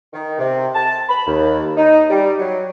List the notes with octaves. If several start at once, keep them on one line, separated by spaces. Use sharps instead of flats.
D#3
C3
A5
B5
D#2
D#4
G3
F#3